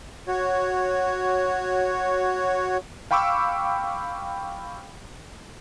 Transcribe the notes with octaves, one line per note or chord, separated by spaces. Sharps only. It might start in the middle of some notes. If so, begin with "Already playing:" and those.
F#4 C#5
F5 G5 B5 C#6 D6 E6